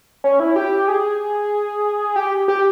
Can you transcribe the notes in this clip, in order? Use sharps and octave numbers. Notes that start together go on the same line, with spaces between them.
C#4
E4
G4
G#4
G4
G4